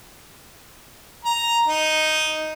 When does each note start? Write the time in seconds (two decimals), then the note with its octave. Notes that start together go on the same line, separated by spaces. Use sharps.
1.25 A#5
1.68 D#4